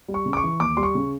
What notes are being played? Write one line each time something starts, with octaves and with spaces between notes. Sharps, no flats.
G3
C#6
C#3
D6
C#6
E3
D#2 D6
G3 C6
C#6
C#3